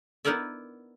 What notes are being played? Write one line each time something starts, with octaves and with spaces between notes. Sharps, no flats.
B3 D#4 E4 A#4 D5 E5